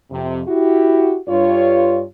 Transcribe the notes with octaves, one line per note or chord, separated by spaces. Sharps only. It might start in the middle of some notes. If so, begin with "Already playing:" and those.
F2 C3
E4 F#4 G4
G2 F4 C#5